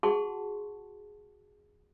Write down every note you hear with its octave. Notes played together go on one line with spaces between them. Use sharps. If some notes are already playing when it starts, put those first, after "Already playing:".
F#4 G#4 F#5 A5 C6 C#6